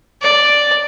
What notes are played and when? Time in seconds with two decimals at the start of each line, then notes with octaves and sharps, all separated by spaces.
0.23 D5